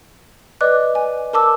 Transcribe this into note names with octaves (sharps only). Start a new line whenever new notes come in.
B4 D5 D#5 D6 F#6
G#5
A#4 A5 D6 E6